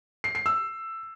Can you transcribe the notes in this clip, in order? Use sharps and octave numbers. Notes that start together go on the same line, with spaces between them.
C7
C7
E6